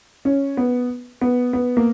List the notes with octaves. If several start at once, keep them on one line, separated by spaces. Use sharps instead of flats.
C#4
B3
B3
B3
A#3